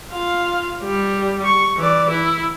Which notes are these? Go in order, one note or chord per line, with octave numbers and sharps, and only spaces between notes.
F4 F5
G3
C#6
E3 D5
E4